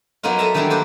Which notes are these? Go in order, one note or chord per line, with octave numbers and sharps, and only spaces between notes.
F#3 A#3 B3 D#4 F4
A4 D#5 E5 A5 A#5
D#3 E3 F#3 G3 B3 D4
A#3 G4 B4 C5